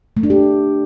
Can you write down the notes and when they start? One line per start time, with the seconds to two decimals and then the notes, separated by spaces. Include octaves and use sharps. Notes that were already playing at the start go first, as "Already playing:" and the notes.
0.17 A3
0.23 D4
0.30 G4